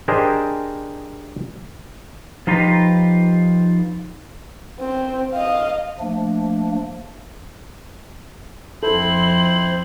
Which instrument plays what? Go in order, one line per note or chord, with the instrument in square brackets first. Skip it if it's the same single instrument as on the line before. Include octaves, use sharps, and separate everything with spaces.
[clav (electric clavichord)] D4 G4 G#4 A#4 C5 D#5
[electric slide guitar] F3 D#4 F4 G4 B4 D#5
[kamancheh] C4
D#5 F5
[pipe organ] F3 A3 A#3 D4
[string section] F2 C4 [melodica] E4 C5 [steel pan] A4 [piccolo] F#7